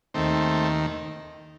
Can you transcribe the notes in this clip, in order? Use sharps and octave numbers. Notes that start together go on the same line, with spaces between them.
D#2 D#3 A3 C4